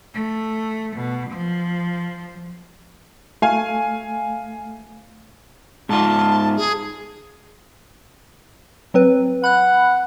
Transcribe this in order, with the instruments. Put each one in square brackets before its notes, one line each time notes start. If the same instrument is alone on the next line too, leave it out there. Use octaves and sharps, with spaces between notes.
[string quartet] A3
B2
F3
[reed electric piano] A3 [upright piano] F5 G#5
[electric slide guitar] G#2 F4 [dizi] A5
[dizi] G#4
[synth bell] F#3 C4 B4
[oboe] F#5 [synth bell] B5 F#6